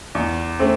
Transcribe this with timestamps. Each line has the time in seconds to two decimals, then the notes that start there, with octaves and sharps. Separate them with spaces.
0.15 E2
0.59 A3 C4